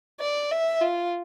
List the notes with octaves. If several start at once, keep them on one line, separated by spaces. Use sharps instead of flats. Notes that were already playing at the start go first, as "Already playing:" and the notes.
D5
E5
F4